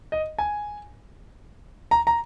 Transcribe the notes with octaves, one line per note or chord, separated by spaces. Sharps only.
D#5
G#5
A#5
A#5